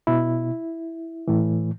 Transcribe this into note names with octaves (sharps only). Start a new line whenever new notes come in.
B2 E4
A2 E3